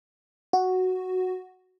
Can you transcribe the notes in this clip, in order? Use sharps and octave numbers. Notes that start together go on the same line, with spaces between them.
F#4